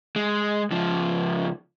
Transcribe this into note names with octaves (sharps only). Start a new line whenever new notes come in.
G#3
C#2 F3